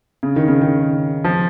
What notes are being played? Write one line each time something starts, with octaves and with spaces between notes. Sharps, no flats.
C#3
D#3
C#3
D#3
F3